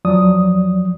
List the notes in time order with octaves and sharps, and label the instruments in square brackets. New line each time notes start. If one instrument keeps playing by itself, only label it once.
[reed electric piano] F2 F3 F#3 D5 D#6